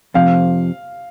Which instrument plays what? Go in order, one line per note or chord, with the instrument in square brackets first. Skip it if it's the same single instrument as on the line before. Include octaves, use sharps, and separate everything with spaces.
[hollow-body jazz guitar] F2 C3 F3 [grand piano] F5